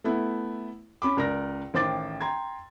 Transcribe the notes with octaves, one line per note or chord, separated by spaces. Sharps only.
A3 B3 E4
C#4 B5 D6
C#2 A#4 D5 A#6
A1 D#3 C5 G5 D6 A6
G5 A#5 C6 G#6